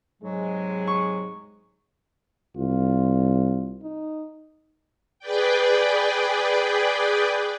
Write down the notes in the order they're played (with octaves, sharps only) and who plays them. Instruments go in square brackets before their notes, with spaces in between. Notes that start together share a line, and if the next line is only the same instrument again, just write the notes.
[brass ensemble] G#2 C3 G#3 [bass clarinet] F#3
[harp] C#6
[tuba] C2 [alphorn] F4
[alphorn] D#4
[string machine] G#4 B4 D5 G5